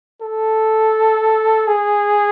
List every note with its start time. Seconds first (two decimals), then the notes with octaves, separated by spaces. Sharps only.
0.22 A4
1.67 G#4